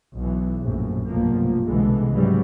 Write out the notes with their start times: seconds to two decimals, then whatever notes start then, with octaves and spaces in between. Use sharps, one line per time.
0.15 B1 E3
0.60 A#1 F#2 A2
1.06 F1 B1 G2 F3 A#3
1.65 C2 B2 D3 E3 G#3
2.11 G#2 C#3 E3 F#3 G3